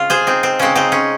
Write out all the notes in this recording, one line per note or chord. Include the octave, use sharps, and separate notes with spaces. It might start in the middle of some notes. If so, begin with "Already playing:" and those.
Already playing: C#3 G#3 C4 F4
G#4 C5
C4 D#4
C4
C#3 G#3 C4 C#4
C4 D#4
C#4